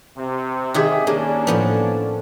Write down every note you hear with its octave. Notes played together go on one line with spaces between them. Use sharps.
C3
D#3 G4 G#4 E5 F#5
A#3 C#4 D4 G#4
A2 F3 B3